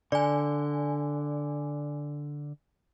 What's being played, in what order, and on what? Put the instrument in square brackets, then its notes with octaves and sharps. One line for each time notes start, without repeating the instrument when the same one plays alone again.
[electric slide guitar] D3 [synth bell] D5 G#5